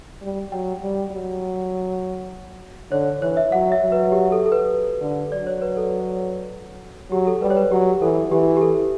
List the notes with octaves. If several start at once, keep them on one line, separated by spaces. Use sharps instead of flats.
G3
F#3 G5
G3
F#3
D3 C#5
E3 C#5
E5
F#3 F#5
E5
F#3
B4
G4
A4
A4
B4
D3
F#3 D5
C#5
B4
A4
F#3 G4
A4
G3 B4
C#5
B4
F#3 G4
E3 A4
E3 G4
G4
A4